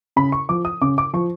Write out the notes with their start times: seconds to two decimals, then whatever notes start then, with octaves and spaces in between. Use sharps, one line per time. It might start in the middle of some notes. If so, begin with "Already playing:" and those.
0.16 C#3 B5
0.32 C#6
0.49 F3 D6
0.65 D#6
0.82 C#3 D6
0.98 D6
1.13 F3 C#6